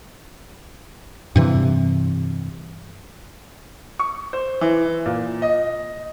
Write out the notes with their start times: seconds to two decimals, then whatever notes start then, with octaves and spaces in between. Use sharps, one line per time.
1.36 G2 C3 E3
3.99 C#6
4.33 C5
4.61 E3
5.06 A#2
5.42 D#5